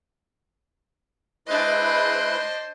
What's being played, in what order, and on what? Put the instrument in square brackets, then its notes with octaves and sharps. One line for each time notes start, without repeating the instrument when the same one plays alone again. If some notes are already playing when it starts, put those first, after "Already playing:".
[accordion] G#3 E4 B4 [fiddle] D4 D#5 [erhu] C5